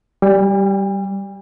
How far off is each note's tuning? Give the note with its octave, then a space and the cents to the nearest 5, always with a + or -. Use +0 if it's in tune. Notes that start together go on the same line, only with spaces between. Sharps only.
G3 -10 G5 +45